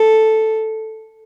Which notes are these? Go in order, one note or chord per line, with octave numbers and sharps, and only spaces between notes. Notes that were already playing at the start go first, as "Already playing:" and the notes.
Already playing: A4